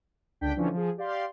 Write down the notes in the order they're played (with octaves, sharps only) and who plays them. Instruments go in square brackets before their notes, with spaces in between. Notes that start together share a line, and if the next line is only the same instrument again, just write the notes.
[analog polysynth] C#2 D3 D4 G5 B6
D3 E3 F3 C#4 D4
F3 G#4
G4 D5 F5 C6